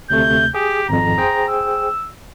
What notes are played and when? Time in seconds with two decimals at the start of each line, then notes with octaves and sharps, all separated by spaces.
0.10 D2 C3 A3 G6
0.54 G4 G#4
0.89 G#1 F2 A#5
1.18 G#4 C5 G5
1.48 E6